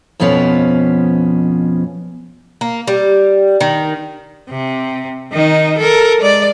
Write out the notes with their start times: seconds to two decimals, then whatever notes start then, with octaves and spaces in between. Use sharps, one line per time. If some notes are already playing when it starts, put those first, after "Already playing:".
0.20 F2 B2 F3 B3 C#4
2.61 A#3
2.88 G3
3.61 D#3
4.50 C3
5.33 D#3 D#4
5.78 A4 A#4
6.20 G#3 D5